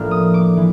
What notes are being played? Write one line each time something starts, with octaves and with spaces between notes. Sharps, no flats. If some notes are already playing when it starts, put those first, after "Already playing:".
Already playing: A2 F3 A#3 D4 F6
D#6
D6
E3